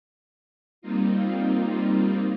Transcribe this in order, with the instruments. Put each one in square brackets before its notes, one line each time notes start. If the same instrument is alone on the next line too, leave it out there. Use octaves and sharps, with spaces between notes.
[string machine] G3 A#3 C4 D#4 F4